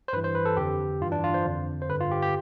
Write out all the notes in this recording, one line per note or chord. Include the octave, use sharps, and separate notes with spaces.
C5
G2 E3 B4
C5
B4
A4
F2 D3 G4
G2 E3 F4
D4
F4
C5
F2 D3
C5
G2 D3 B4
F4
G4
G4